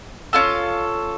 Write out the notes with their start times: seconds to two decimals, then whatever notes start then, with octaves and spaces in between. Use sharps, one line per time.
0.33 C#4 F4 A4